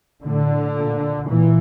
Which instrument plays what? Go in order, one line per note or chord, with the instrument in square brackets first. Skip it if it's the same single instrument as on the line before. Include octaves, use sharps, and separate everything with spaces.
[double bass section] A2 D3
A#2
A#2 E3